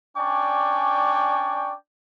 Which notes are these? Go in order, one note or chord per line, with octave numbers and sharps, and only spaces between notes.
C#4 D4 D5 G5 G#5 C#6